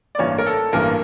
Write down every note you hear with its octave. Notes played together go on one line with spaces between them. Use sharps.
D5
A1 G2 E3 A#3 C#5
A#4
A4
A1 G2 E3 A#3 A#4